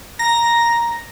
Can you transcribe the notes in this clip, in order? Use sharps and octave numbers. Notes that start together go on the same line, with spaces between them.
A#5 A#6